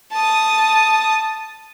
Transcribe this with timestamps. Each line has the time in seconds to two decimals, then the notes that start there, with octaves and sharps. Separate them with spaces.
0.12 A5 D#6